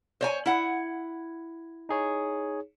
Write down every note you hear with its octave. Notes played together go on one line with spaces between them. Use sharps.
C5 C#5 G#5
E4 F#5
D#4 G#4 C#5